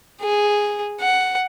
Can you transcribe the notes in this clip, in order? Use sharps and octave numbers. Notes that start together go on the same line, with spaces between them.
G#4
F#5